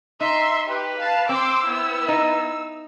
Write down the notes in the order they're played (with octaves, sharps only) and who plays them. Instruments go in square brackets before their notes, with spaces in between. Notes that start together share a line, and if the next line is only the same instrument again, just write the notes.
[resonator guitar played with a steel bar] D#4 [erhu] E5 [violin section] C6
[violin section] G4 [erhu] B4
[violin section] F5 A5
[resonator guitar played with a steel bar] C4 [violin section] C6 D6 [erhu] E6
[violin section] B3 E4
[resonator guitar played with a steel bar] D#4